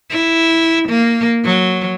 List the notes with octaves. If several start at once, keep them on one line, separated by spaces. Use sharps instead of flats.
E4
A#3
F#3